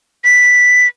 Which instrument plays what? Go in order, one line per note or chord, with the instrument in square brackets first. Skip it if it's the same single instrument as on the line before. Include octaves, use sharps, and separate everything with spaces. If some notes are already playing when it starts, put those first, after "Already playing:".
[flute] B6